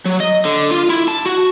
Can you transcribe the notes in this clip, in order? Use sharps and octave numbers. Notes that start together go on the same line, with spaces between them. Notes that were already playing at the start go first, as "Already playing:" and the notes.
F#3
D#5
D3
F4
E4
A5
F#4